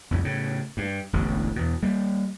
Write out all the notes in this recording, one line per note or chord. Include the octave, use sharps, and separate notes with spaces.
C2 F2 A2
A2 C#3
G2
E1 A1 A2 D3
E2 B2
G3 A#3